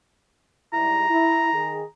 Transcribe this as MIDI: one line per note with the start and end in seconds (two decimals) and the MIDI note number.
0.73 1.05 44
0.73 1.05 55
0.73 1.05 64
0.73 1.89 82
1.09 1.53 64
1.53 1.84 51
1.53 1.84 68